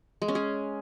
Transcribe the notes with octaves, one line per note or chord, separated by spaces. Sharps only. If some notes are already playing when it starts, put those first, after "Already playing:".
G#3
C#4
G#4